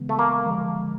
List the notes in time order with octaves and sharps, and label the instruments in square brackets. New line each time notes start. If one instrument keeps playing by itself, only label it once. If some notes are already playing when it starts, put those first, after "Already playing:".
Already playing: [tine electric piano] C#3 E3 G#3 B3
[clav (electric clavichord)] A3
A#3
[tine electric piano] D3 F3 G#3